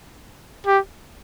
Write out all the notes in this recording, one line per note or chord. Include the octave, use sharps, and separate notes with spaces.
G4